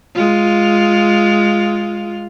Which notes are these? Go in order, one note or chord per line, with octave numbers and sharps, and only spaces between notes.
G#3 F4